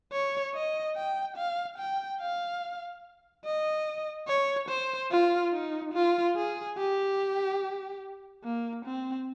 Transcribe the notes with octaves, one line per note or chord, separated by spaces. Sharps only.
C#5
D#5
G5
F5
G5
F5
D#5
C#5
C5
F4
D#4
F4
G#4
G4
A#3
C4